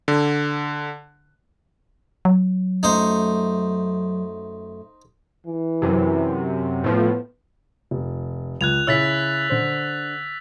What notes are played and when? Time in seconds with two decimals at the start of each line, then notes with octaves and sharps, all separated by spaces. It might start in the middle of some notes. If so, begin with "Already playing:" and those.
0.08 D3
2.25 F#3
2.83 F#2 A3 D#4 C5
5.46 E3
5.82 F#2 C3
6.84 A2 F3 B3
7.91 F1
8.61 C#2 F#6 G#6 F7
8.87 C#3 E4 C#5 E6 A6 B6
9.50 D3 C5